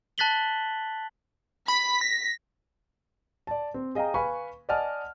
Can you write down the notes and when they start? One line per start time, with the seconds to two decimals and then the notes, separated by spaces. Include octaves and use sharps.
0.18 A5 F#6 A6 B6 F#7 G7
1.68 B5 B6
2.01 A#6
3.47 D5 A5
3.74 C4
3.95 G#4 D#5 F5 G5 A#5
4.14 B4 F5 G#5 B5 C#6
4.69 D5 D#5 F#5 G#5 A5 F6